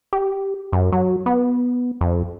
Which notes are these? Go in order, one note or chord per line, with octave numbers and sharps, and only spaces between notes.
G4
F#2
F#3
B3
F2